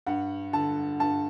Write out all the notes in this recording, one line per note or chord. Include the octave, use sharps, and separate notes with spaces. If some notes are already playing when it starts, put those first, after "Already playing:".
G2 F#5
D3 A5
G2 A5